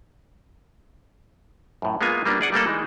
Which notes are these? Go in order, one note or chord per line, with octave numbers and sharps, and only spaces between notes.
F#2 A2
G#3 A#3 B3 F4 G#5
G3 A#3 B3 C#4 D4 F#4
G#4 D5 F#5 G#5
G3 A3 A#3 A4
E3 G#3 D#4